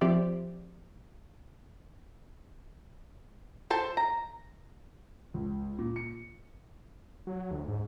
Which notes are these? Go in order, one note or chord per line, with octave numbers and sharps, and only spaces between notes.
F3 C4 G4 C5 D5 E5
A4 C5 A5
A#5
C#2
A#2
C#7
F#3
D2
G#2